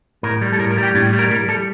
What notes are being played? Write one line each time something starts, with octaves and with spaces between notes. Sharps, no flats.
A2 A#4
G3
A4
A2 A#4
A#4
G3
G4
A2 D4
G3
A#4
G3 A#4
G3 A4